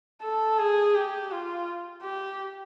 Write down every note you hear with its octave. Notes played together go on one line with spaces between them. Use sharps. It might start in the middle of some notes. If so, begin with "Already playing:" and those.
A4
G#4
G4
F4
G4